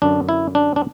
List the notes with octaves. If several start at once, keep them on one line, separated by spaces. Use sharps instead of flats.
F#2 D3 D4
E4
D4
D4